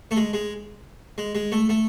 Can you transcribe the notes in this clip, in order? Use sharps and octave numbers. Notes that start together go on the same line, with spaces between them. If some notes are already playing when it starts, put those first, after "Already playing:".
A3
G#3
G#3
G#3
G#3
A3
A3